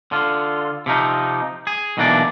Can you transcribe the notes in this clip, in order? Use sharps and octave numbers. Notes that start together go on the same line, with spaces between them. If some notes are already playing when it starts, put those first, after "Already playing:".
D3 F4
C3 F3 D#4
G#4
B1 B2 E3 A#3 D4 D5